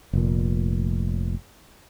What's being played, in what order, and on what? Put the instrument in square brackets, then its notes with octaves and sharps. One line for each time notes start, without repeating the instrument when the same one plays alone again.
[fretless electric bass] F1 A#2